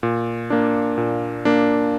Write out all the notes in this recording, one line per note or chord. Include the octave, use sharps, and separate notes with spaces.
A#2
A#3 D4
A#2
A#3 D4